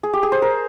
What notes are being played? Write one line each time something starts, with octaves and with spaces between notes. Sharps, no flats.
G#4
G4
G#4
C5
A#4